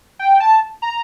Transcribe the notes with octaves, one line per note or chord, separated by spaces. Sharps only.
G5
A5
A#5